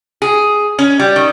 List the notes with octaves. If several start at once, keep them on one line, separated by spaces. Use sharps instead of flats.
G#4
C#4
G3
D#3